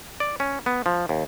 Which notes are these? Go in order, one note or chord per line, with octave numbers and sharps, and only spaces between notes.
D5
C#4
B3
F3
D#2